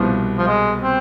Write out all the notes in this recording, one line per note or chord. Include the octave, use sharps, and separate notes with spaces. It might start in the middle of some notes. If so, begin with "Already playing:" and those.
Already playing: C2 B2 F3 B3
F3
G#3
C4